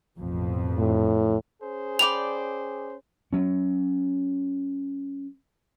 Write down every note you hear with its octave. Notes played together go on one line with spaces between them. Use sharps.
A1 F2 B2
A2
C#4 G#4 C5
D5 G5 B5 F7
F#3 C#4